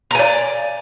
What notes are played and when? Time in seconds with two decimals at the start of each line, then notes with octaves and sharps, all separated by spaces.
0.11 A#5
0.15 G#5
0.19 D5